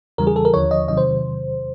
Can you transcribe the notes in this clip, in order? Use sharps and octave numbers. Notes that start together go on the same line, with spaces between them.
E2 C#3 E3 G3 A#4
G#4
A4
A#4
D#2 D3 F3 C#5
D#5
E2 C3 D#3 F#3 D#5
C5